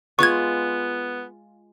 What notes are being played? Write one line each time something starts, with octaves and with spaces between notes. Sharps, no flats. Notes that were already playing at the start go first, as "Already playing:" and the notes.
G#3 B3 F4 F5 C#6 G#6